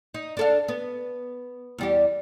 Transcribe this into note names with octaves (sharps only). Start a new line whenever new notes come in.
D#4
D4 A4 F5
B3
E2 G3 G4